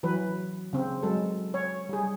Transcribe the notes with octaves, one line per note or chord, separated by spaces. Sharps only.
E3 F#3 B4
C#3 C4
F#3 G#3 A4
C#5
G3 G#4